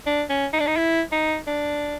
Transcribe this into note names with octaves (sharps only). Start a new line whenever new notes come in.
D4
C#4
D#4
D4
D#4
E4
D#4
D4